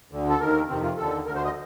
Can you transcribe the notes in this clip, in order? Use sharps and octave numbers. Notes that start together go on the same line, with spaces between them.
D2 D3
A4
D#2 D#3 A#4
F2 C3 D#3 C4
F4
D#2 D3 A4
D2 D3 A#4
C5
D#5